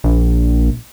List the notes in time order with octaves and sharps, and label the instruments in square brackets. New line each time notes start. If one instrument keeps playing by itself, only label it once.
[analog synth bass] A#1